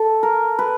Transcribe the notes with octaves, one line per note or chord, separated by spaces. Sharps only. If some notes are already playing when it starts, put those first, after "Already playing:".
Already playing: A4
A#4
B4